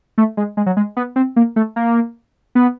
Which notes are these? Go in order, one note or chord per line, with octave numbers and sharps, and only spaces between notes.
A3
G#3
G#3
F#3
G#3
B3
C4
A#3
A3
A#3
B3